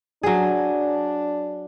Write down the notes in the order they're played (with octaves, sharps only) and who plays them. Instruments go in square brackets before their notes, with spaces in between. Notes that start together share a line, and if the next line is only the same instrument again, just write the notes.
[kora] F#3 G#4 [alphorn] D4